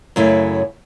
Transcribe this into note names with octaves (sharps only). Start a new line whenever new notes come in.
F#2 C#3 A3 E4